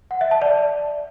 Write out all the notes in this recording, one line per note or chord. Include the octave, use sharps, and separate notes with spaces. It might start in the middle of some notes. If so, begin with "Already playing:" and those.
F#5
E5
A5
D5